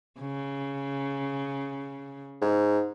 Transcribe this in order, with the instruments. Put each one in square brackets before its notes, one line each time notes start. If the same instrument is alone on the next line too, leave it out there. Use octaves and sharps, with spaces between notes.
[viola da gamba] C#3
[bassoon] G#2